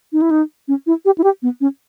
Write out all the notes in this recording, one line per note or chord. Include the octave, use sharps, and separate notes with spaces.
D#4
E4
D#4
C#4
E4
G4
E4
G4
B3
C#4